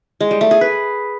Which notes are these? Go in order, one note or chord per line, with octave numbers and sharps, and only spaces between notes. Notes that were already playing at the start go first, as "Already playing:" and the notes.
G#3
G3
A3
G#4
B4